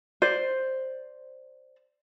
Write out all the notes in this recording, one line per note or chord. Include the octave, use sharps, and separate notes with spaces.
C5 D5